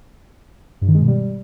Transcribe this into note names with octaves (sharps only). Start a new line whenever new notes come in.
G2
D#3
G#3
B2
G3